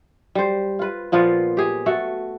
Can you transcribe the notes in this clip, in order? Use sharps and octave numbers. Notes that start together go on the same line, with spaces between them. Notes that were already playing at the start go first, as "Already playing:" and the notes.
G3 C5
F4 B4
A#2 F3 B3 F4
G4 G#4
A3 F#4 A4